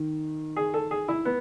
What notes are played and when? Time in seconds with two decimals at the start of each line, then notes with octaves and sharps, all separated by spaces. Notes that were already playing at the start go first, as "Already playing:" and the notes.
Already playing: D#3
0.56 G#4
0.74 A4
0.91 G#4
1.08 E4
1.25 B3